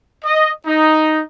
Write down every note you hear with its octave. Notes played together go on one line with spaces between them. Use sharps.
D#5
D#4